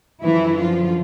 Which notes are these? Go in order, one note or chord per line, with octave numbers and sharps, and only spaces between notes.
F#2 D3 E3 F3 E4
F3 F4